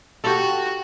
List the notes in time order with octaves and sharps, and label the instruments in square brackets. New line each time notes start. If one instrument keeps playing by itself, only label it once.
[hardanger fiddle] F#4 [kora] G4 A4